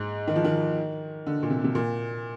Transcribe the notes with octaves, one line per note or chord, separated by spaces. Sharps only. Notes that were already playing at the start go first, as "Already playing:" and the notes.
Already playing: G#2
D#3
F3
D#3
D3
A#2
C3
C3
A#2